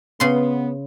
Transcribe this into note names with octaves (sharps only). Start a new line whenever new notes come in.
C#3 B3 C6